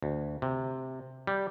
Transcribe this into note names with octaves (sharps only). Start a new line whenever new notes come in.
D2
C3
G3